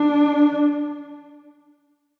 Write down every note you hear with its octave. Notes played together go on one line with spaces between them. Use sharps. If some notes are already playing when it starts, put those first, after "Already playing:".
Already playing: D4